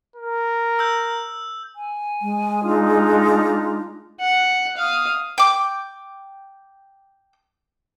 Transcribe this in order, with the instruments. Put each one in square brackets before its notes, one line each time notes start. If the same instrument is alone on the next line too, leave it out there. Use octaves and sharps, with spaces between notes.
[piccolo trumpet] A#4
[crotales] E6 G6
[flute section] G#5
[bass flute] G#3
[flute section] D4 D#4 F4
[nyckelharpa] F#5
F5 D#6
[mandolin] G5 D6